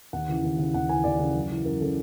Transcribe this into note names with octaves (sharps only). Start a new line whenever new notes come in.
D#2 F#5
C#3 E3
D#2
C#3 E3
D#2 F#5
C#3 E3 G#5
D#2 D5
C#3 E3
F#2
C#3 E3
F#2 A#4
C#3 E3 A4